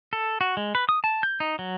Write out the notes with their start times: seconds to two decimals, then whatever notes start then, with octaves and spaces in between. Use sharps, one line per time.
0.13 A4
0.41 F#4
0.57 G#3
0.75 B4
0.89 D#6
1.04 A5
1.23 G6
1.40 D#4
1.59 F#3